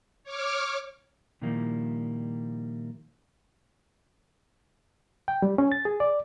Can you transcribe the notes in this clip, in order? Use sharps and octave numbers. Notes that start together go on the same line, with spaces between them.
C#5 D6 F6
A#2 D#3 F3 G3 A#3 E4
G5
G3
C#4
A6
G#4
D5